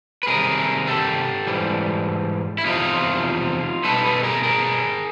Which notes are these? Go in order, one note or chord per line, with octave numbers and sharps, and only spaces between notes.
B4
C3 D#3 G3 G#4 A#4
G4 A4
G#2 E3 G3
E4
E2 C3 F3 D#4 F4
B2 G3 B3 D#4 A4 B4
A4 B4
G#4 A#4
G#4 A#4